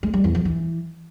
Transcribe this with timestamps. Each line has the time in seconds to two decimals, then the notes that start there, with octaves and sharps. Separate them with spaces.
0.03 G#3
0.14 G3
0.24 E2
0.35 F3
0.45 E3